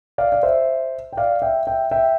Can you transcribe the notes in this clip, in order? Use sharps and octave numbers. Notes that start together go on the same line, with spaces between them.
D5 F5
D5
C5 E5
G5
D5 F5
E5 G5
E5 G5
E5 G5